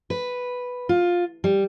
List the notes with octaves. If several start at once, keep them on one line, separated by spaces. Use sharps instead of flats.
B4
F4
G3